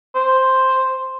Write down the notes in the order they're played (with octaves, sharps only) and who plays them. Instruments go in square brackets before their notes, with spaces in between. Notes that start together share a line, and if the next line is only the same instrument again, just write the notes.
[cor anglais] C5